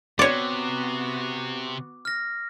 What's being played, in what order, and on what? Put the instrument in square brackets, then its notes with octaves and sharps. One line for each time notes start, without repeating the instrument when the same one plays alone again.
[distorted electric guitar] C3 [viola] B3 F#4 [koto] C#5 D5 [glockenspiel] D6
[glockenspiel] F6 A#6